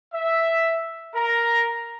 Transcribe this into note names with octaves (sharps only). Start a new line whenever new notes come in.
E5
A#4 A#5